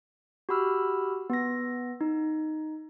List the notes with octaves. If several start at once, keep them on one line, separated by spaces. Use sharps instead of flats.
F#4 G4 B5 E6 F6
B3 A#6
D#4